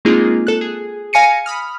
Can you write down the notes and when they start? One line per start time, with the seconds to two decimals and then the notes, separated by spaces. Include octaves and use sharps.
0.05 G#3 A#3 C4 D#4 F4 G#4
0.47 A4 F#6
0.61 G#4
1.13 F5 G#5 A#6 C#7 D#7
1.46 B5 D#6 F6